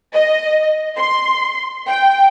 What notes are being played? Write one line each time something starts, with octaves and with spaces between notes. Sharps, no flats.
D#5
C6
G5